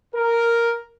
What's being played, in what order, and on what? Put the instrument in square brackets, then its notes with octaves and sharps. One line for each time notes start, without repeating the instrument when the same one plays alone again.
[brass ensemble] A#4